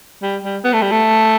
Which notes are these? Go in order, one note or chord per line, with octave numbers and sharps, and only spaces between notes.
G3
G3
B3
A3
G3
A3